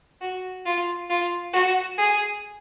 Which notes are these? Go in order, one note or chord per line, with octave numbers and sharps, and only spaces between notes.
F#4
F4
F4
F#4
G#4